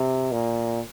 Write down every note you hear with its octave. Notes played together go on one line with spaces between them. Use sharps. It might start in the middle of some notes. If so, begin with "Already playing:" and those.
Already playing: C3
A#2